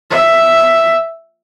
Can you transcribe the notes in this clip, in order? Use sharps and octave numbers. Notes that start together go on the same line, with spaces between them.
E5